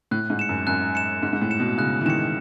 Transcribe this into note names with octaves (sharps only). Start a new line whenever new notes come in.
A2 F#6
G#2
C#7 E7
F#2
F#2 F#6
C#7 E7
G#2 F#6
G#2
A2
C#7 E7
B2
C#3 F#6
E3
D#3 C#7 E7